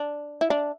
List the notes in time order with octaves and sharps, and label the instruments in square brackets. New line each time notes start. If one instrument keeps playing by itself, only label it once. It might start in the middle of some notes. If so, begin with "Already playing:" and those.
Already playing: [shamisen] D4
E4
D4